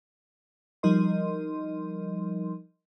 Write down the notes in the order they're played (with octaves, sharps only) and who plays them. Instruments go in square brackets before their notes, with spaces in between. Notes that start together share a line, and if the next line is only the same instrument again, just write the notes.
[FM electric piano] F3 G3 D#4 A#4 D#5 C6